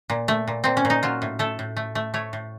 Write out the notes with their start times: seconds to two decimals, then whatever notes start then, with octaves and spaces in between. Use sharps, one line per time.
0.10 A#2
0.28 A3
0.48 A#2
0.64 A#2 C4
0.77 C#4
0.85 A#2
0.90 D#4
1.03 F#3 F4
1.22 A2
1.39 A3 A4
1.59 A2
1.76 A3
1.95 A3
2.14 A3 C#5
2.33 A2